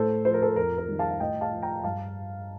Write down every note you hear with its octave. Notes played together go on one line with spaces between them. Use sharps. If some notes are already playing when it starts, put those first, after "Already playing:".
Already playing: A2 A4 C5
F3 C5
A#4
A4 C5
F2 A#4
A#4
D#3 G3
F5 A5
F5
A2 D#5 G5
F5 A5
F3
G5 A#5
G2 F5 A5